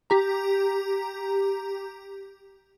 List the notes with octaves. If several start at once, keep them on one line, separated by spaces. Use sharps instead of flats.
G4 A#5